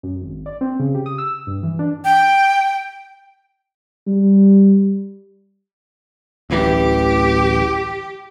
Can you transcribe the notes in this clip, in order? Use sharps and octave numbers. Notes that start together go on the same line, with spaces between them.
F#2
G#1
D5
C4
C#3
G4
D#6
E6
G2
E3
D4
G5
G3
D1 A1 E3 G4